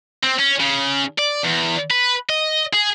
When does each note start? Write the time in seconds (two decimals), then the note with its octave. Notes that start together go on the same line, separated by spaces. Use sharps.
0.24 C4
0.39 C#4
0.60 C#3
1.18 D5
1.44 E2
1.91 B4
2.29 D#5
2.73 G#4